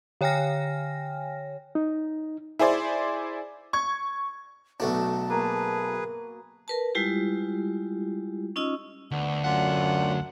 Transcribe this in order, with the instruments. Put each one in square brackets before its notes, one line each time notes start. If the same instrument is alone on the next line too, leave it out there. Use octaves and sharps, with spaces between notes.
[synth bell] D3 C#5 G5 G#5 F6 A#6
[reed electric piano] D#4
[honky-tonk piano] E4 G#4 C5 D5
C#6 G#6
[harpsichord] B1 A3 D4 [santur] F#4 [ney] A5
[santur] A#3 [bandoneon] G#4 B4
[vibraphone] A#4 B4 A5
G3 G#3 E4 F4 G4
C#4 D#4 F4 D#5 E6
[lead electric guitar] D2 [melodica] B3 D4
[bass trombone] F#2 [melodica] D4 F4 [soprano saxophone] F#5